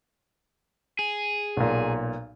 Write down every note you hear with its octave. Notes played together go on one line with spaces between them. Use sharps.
G#4
B1 A#2